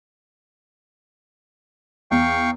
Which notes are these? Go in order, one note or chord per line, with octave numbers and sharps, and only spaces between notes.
E2 F5 G5 C#6